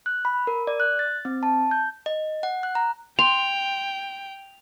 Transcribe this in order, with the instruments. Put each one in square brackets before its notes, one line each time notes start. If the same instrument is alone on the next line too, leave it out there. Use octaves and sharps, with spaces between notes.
[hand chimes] F#6
B5
A#4
D5
F#6
A6
C4
A5
G6
D#5
F#5
F#6
A#5
[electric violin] G5 [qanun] C6 [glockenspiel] F7